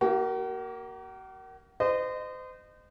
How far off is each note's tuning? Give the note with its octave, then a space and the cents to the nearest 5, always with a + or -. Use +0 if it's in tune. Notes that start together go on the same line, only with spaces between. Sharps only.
A#3 +0 F#4 +45
C5 -35 D#5 -30